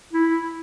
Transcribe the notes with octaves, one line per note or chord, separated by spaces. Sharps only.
E4